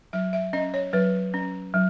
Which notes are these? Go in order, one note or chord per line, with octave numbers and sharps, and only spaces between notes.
F#3 E5
E5
C#4 D#5
C#5
F#3 B4
C#4
F#3